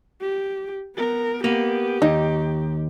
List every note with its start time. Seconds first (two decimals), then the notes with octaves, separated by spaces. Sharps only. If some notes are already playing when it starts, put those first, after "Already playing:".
0.21 G4
0.96 B3 A#4
1.44 A#3 B3 G4
2.02 D#2 D#4